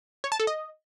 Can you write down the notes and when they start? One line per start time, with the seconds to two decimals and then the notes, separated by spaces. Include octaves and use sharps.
0.24 C#5
0.32 A5
0.40 A4
0.47 D#5